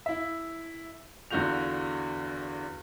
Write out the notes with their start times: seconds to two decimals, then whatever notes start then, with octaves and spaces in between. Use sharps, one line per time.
0.06 E4 E5
1.31 E2 D3 F4 F#4 G6 F7